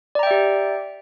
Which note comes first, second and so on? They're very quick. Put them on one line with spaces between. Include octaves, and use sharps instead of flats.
D5 A#5 G5 E5 G4